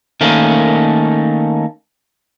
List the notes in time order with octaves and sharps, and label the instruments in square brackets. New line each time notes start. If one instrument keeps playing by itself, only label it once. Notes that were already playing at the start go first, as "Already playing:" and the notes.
[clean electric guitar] D#3 A3 A#3 C#4